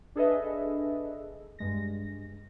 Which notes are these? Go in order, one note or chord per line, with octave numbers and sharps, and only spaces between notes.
D4 G#4 A4 B4 D#5 E5
G2 G#3 A#6